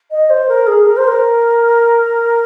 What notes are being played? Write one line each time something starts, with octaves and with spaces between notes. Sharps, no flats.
D#5
C5
A#4
G#4
A#4
C5
A#4